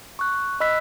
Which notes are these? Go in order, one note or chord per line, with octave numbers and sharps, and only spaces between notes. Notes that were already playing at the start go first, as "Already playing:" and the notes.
C#6 F#6
D#5 B5 E6 F#6 B6